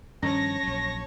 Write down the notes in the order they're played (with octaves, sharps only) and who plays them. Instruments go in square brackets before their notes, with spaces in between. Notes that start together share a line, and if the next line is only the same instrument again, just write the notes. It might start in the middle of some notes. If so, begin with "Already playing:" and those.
[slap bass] G2 D#3 F3 [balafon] C#4 [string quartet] C#5 A5 C#6 [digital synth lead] A#6
[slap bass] A#1 F#3